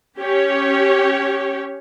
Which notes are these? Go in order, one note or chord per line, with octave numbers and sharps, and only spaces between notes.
C#4 G4 C#5